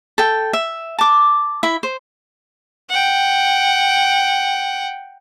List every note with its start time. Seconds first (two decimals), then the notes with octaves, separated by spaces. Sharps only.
0.18 A4 G5
0.53 E5
0.99 A5 D6
1.63 E4 E5
1.83 C5
2.89 F#5 G5